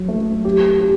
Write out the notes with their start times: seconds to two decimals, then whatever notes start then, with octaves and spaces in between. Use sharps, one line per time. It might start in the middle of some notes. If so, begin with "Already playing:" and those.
Already playing: F#3
0.08 A3
0.45 G4
0.81 G4